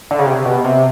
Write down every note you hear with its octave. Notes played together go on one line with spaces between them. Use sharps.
D3
C#3
C3
B2
C3